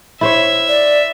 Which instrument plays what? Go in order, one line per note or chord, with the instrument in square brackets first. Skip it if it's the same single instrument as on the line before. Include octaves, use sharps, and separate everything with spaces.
[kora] E4 C5 C#5 [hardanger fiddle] E5
[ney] D5